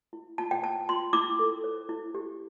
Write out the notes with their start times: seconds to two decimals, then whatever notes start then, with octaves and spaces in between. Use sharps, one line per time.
0.13 E4
0.38 F4 A5
0.51 G5
0.63 C5 A5
0.89 F4 C6
1.13 E4 D6
1.39 A4
1.64 C5
1.89 E4
2.15 G4